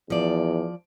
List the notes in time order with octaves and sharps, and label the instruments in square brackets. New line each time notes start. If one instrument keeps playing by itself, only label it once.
[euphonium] E2 [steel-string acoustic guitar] F3 D5